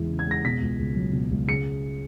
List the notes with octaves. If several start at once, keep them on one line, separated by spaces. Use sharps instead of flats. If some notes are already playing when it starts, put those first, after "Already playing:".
Already playing: E2 C#3 E3 G#3
C#3
G#6
G#3 A#6
B2 B6
C#2
C#2
F#3
B2
C#2
C#3 C#7